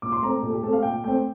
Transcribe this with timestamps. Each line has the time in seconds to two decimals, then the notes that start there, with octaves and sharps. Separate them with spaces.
0.02 A#2 D6
0.12 C6
0.22 A3 C4 A#5
0.42 A#2 A4
0.53 G4
0.63 A3 A4
0.66 C4
0.73 F5
0.83 A#2 G5
1.04 A3 C4 G5